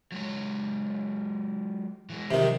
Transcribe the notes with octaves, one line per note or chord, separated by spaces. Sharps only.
F#3 G#3 C#5
E3 G#3
C3 D#3 F3 F#3